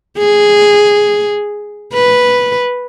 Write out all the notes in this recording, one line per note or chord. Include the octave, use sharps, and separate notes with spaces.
G#4
B4